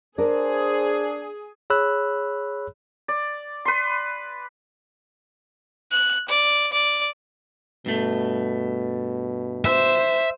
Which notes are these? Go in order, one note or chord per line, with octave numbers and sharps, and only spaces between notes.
D4 G#4 A#4 C5
G#4 C#5 B5 E6 F#6
D5
B4 C6
F#6
D5
D5
G2 B2 A3
C5 E5